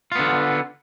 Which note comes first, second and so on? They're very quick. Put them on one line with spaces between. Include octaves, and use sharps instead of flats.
F4 B3 D3